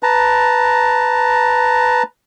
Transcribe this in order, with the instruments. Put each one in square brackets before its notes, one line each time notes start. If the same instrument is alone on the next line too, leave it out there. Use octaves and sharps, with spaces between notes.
[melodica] B4 A5 A#5